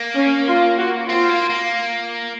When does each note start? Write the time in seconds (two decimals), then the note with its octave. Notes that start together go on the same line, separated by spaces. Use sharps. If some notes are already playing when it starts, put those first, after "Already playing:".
Already playing: A#3
0.17 C#4
0.47 F4
0.78 F#4
1.09 C4 F4
1.29 A#3
1.50 A#3